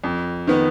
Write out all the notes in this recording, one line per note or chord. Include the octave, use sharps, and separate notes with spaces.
F2
D#3 B3